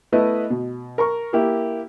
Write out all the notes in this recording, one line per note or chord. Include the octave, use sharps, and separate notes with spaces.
A3 B3 E4 B4 D#5
B2
A#4 A#5 C#6
A#3 E4 G4